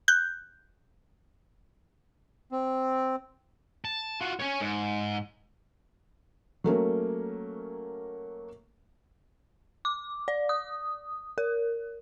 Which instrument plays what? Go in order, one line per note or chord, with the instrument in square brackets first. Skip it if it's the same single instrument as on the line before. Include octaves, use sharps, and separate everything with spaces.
[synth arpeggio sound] F#6 G6
[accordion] C4
[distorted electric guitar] A5
F4 F#4
C#4 C#5
G#2
[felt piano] F#3 A3 A#3 C#4
[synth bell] D6
D5
D#6
A#4